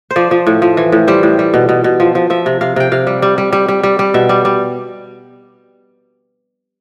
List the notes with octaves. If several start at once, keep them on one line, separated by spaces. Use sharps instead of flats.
C5
F3 D5
F3
A2
F3
E3
A2
G3 C5
A2
G3
B2
B2
B2
F3
F3
F3 E5
C3
C3 F5
C3 G5
C3 F5
G3
G3
G3
G3
G3
G3
G3
B2 E5
G3
G3